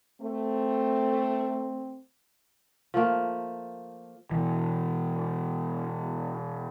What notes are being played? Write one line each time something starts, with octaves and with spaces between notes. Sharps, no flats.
A3 C4
F3 A3 A#3
B2 E3